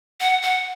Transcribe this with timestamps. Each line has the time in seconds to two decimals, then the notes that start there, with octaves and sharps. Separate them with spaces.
0.20 F#5
0.42 F#5